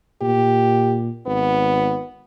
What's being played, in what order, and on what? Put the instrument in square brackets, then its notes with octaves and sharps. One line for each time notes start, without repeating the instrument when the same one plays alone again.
[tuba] A#2 [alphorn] G4
[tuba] G#1 [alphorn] B3